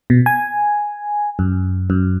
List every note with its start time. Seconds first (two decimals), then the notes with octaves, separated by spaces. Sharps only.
0.10 B2
0.26 G#5
1.39 F#2
1.90 F#2